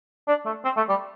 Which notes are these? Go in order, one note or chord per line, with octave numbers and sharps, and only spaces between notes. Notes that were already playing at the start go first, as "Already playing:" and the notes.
D4
A3
C4
A3
G3